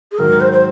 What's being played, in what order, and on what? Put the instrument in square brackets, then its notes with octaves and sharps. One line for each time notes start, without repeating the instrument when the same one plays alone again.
[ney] G#4
[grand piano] G#2 D#3 F#3 [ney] A#4
[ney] C5
C5